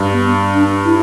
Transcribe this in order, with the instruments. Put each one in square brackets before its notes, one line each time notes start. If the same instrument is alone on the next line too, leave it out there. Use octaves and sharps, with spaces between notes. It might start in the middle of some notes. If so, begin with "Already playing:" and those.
Already playing: [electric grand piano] G2
[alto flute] B3
D4
E4